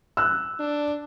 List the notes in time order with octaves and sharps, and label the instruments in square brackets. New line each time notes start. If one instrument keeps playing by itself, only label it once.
[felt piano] E6 F#6
[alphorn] D4